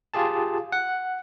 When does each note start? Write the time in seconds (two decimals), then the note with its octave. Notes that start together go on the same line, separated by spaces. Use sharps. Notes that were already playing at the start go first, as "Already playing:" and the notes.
0.14 F4 G4 G#4 A5
0.72 F#5